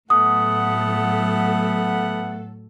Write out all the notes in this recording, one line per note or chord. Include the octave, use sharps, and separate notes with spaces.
A2 F#3 A3 B3 A4 F#5 D#6